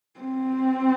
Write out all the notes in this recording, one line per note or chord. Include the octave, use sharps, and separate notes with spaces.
C4